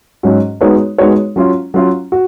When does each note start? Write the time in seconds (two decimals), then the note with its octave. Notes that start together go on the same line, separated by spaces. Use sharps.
0.23 G#2 F#3 C#4 F#4
0.61 G#3 B3 D#4 F#4 C#5
0.98 G#3 B3 D#4 F#4 C#5
1.36 F#3 C#4 F4
1.74 F#3 C#4 F4
2.12 F#4